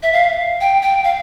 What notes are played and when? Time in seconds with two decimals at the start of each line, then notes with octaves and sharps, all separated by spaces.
0.03 E5
0.13 F5
0.61 G5
0.82 G5
1.04 F5